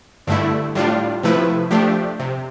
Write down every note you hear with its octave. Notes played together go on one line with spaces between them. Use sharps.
G2 D3 A3 E4
A2 G3 D4 F4
C3 F3 A3 E4 B4
F3 A3 D4 G4
C3